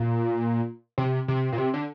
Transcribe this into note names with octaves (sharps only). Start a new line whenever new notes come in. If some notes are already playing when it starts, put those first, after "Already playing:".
Already playing: A#2
C3
C3
A#2
C3
D3